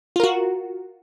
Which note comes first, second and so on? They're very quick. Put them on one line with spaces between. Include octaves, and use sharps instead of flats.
F4 A#4 F#4